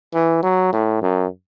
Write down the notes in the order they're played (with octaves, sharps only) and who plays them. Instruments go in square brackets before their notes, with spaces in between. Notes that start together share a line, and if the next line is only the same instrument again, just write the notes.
[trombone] E3
F#3
A2
F#2